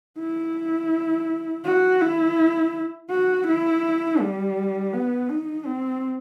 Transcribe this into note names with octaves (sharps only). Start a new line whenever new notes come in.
E4
F#4
E4
F#4
E4
G3
B3
D#4
C4